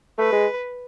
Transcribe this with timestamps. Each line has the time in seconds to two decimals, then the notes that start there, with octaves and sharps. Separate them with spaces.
0.18 A3 B4
0.32 G#3